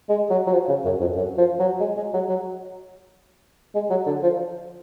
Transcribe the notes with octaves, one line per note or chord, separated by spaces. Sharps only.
G#3
F#3
F#3
F3
C#3
F#2
F2
F#2
F3
F#3
G#3
G#3
F#3
F#3
G#3
F#3
D3
F3